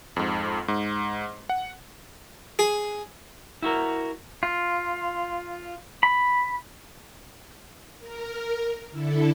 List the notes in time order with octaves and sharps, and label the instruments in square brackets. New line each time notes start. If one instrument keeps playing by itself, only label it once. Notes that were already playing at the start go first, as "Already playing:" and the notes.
[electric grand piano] F2 G#2
G#2
F#5
[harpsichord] G#4
[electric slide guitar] E4 F#4 A#4
[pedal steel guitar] F4
B5
[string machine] A#4
D3 E4 A4